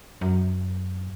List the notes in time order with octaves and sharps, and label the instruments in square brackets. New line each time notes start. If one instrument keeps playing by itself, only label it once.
[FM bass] F#2